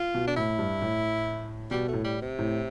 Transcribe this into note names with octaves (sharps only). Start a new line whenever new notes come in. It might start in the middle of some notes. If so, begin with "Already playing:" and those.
Already playing: F4
B2
D4
A2 E4
G2
A2
B2 G3
A3
A2
G3
C3
A2